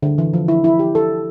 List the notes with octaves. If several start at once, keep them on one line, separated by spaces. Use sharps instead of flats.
D3
E3
F3
E4
E4
G4
A4